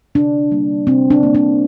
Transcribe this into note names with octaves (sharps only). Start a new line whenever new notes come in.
C3 D4
G3 A#3
C3 C4
D4
G3 A#3
D4